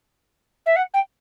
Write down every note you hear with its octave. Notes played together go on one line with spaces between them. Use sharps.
E5
F#5
G5